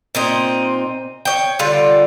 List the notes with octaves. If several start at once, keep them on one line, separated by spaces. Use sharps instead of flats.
A#2 C4 D#4
C#5 G5
D3 G3 F4 A4